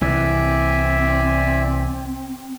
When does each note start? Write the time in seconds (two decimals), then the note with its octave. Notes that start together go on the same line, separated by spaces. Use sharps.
0.01 C2 E3 C4 D5 E5 G#5